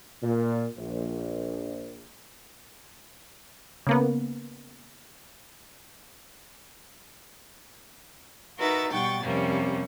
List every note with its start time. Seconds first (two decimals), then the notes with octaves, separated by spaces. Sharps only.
0.23 A#2
0.77 A#1
3.87 C#3 A#3 B3
8.59 D#4 F#4 A#4 B4 E5 A6
8.91 B2 G3 F#5 G5 C#6 A6
9.24 F2 C3 G3 A#3 C#4